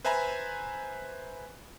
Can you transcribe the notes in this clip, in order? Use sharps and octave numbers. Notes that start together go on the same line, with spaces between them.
B4 C5 E5 G#5 A#5 B5